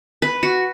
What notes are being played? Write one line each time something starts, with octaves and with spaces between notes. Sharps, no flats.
B4
F#4